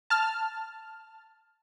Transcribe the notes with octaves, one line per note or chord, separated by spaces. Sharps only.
A5 F6